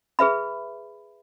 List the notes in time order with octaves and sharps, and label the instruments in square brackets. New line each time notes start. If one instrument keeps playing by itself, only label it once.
[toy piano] G#4 B4 E5 B5